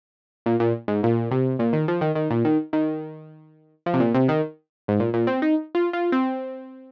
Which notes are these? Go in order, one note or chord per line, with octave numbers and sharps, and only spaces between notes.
A#2
A#2
G#2
A#2
C3
A#2
D#3
F3
D#3
D#3
A#2
D#3
D#3
F3
C3
A#2
C3
D#3
G#2
A#2
A#2
C4
D#4
F4
F4
C4